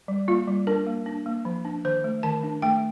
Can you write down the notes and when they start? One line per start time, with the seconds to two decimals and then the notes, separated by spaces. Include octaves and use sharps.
0.08 G3
0.28 A#3 F4
0.48 G3
0.67 D4 A#4
0.87 A#3
1.06 D4
1.26 A#3
1.45 F3
1.65 D4
1.85 D#3 C5
2.04 A3
2.23 D#3 A5
2.43 D4
2.62 A3 G5